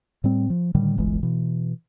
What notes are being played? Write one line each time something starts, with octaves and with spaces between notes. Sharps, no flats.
A2 G3 C4
F3
A2 D3 D#3 G3
D1 G1 E3 G#3
B2 E3